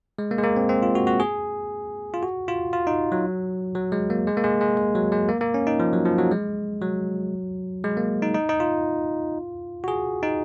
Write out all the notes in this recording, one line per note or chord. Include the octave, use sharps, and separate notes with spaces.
G#3
A#3
G#3
A#3
C4
C4
F4
F#4
F#4
G#4
F4
F#4
F4
F4
D#4
F#3
F#3
G#3
A#3
G#3
A#3
G#3
G#3
G#3
F#3
G#3
A#3
A#3
C#4
D#4
F3
F#3
F3
F#3
G#3
F#3
G#3
A#3
D#4
D#4
D#4
F4
F#4
G#4
D#4